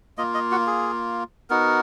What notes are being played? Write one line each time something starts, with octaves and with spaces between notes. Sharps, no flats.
A#3 F4 D#5
D#5
F#4
G#4
B3 D#4 F#4 A#4